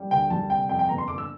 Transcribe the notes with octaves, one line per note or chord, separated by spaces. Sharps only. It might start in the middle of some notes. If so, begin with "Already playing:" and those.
Already playing: G3
D2 G5
G3 A5
C3 G5
F2 G5
G5
G1 A#5
C6
G1 D6
E6